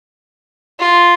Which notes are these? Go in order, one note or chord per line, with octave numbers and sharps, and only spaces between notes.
F4